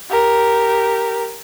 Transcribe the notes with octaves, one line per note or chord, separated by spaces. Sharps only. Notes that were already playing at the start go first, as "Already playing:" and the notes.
G4 A#4